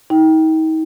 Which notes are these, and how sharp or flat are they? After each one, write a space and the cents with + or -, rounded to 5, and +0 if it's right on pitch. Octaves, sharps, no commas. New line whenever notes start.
D#4 +35 G5 +0